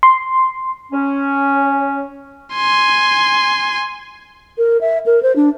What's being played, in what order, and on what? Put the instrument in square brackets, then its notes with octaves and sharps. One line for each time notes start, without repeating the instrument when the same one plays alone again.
[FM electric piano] C6
[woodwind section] C#4
[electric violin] G#5 C6
[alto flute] A#4
E5
A#4
C5
D4